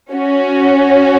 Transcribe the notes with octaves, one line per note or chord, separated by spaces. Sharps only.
C#4 F#4